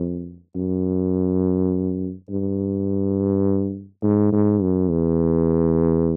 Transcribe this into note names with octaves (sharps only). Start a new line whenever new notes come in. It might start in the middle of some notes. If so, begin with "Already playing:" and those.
Already playing: F2
F#2
G2
G#2
G#2
F#2
E2